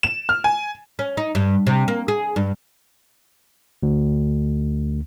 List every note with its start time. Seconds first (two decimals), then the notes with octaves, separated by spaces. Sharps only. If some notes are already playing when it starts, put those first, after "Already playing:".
0.03 E7
0.29 F6
0.44 G#5
0.99 C#4
1.17 D#4
1.35 G2
1.67 C3
1.88 A#3
2.08 G#4
2.36 G2
3.83 D2